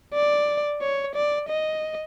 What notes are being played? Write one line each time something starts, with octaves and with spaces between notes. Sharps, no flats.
D5
C#5
D5
D#5